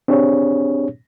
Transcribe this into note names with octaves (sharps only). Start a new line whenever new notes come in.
C4 D4 G4 G#4 C#5